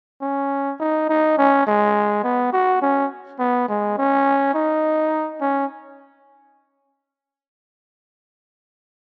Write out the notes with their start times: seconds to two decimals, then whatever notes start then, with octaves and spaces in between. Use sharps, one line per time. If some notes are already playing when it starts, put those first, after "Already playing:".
0.22 C#4
0.80 D#4
1.09 D#4
1.38 C#4
1.67 G#3
2.24 B3
2.53 F#4
2.82 C#4
3.39 B3
3.68 G#3
3.97 C#4
4.54 D#4
5.41 C#4